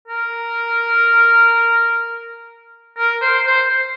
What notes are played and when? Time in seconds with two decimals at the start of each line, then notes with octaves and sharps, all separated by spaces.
0.08 A#4
2.98 A#4
3.22 C5
3.47 C5